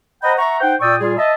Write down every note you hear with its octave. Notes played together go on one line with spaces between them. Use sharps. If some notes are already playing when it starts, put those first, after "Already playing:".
C5 D#5 F#5 G5 A#5 B5
E5 F#5 A#5 C#6
D#4 C5 F#5 G5
A#2 D5 G5 C#6 D#6 E6
A#2 G3 F4 G#4
D#5 E5 A5